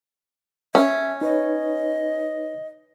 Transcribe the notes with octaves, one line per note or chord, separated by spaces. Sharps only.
C#4 E5
D#4 B4 C#5 D#5